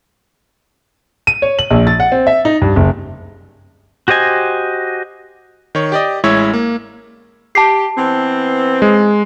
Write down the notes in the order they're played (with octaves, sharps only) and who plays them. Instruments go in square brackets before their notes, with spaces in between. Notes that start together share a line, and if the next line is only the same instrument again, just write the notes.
[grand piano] D#7
C#5
F#7
A#1
A6
F#5
C4
E5
D#4
G2
F#1
[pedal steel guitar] F#4 G4 C5 D#5 G#5
[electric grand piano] D#3 C#5
G4 D5 D#5
A1 G#3 E4 C#5 E6 G#6
A#3
[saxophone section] G4 [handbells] A5 C7
[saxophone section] E3 B3 C4
[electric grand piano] G#3